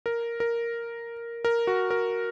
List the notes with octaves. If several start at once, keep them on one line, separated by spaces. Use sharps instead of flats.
A#4
A#4
A#4
F#4
A#4